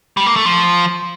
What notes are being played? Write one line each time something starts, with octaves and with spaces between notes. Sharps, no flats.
G3
A#3
A3
F3